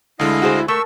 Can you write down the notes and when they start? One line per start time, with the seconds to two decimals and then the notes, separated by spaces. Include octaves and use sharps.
0.19 D2 D3 G#3 E4 D#5 F5
0.42 F#4 G#4 C5
0.68 A3 A#4 C#6 E6